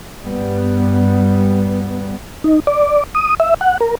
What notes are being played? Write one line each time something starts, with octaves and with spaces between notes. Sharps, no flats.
G2 G3 B3
D#4
D5
D#6
E5
F#5
A#4